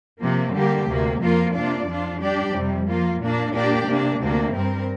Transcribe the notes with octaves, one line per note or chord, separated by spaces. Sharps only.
C3 F3 A#3
D3 G3 A#3 G4
D2 C3 A#3
F2 F3 A#3 F4 A#4
C3 A#3 D4 F4 D5
F2 F3 D4 F4
G3 D4 G4 D5
F2 C3 G3
F3 A#3 F4
A#2 A#3 D4
A#2 A#3 D4 G4 D5
C3 A#3 D4
D2 C3 A#3 D4
G2 G3 C4 A#4